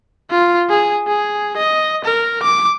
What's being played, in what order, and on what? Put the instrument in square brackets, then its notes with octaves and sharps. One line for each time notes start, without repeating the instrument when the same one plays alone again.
[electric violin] F4
G#4
G#4
D#5
A#4
D6